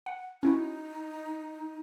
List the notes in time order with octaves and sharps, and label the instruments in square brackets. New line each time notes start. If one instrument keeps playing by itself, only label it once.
[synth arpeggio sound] F#5
[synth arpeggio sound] C#4 E4 F#4 [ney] D#4